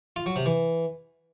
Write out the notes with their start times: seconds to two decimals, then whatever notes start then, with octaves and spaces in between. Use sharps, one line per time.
0.16 F4
0.26 F#3
0.36 C3
0.46 E3